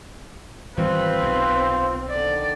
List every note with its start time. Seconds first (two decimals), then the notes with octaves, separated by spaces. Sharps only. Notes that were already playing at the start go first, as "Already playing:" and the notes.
0.77 G#1 E3 G3 C4 F4 B4 C5 F5
1.22 B1 C3
2.10 D3 D#3 D5